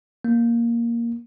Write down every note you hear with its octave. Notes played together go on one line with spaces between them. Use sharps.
A#3